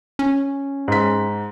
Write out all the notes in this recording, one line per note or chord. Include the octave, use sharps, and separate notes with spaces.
C#4
G#2 B6